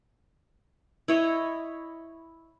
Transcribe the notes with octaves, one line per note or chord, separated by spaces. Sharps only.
E4 C#5 D#5